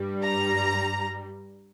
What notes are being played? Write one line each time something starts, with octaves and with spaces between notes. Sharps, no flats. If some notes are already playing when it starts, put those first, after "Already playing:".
Already playing: G2 G3
A#5